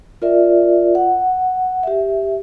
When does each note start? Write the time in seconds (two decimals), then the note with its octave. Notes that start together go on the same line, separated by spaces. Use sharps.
0.22 F4 A#4 D5 E5
0.95 F#5
1.83 G4 E5